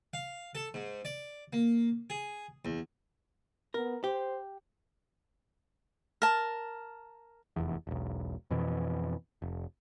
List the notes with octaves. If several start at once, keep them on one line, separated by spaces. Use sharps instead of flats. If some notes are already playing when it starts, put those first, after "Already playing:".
F5
A4
G#2
D5
A#3
G#4
E2
B3 A#4
G4 C5
A#4 A5
F1 E2
E1 B1
F2 B2 E3
F1